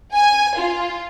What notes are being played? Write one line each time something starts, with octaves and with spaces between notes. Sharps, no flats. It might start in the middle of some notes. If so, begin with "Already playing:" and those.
G#5
F4